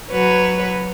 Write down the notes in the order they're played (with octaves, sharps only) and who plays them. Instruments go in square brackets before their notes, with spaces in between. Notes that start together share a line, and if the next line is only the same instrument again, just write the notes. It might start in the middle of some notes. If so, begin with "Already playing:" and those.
[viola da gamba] F#3 B4 C#5